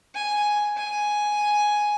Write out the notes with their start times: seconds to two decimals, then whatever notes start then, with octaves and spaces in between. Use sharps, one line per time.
0.15 G#5
0.77 G#5